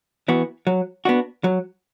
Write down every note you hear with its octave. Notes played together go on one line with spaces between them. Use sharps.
E3 B3 F#4
F#3
B3 D4 F#4
F#3